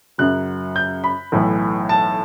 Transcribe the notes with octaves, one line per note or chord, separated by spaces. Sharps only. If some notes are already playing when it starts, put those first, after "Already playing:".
F#2 C#3 F#3 F#6
G6
B5
B1 A2 E3
A5